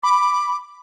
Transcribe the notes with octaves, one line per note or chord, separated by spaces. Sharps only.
B5 D6